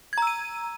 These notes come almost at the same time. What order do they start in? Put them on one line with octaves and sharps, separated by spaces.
G#6 A#5 E6 D#7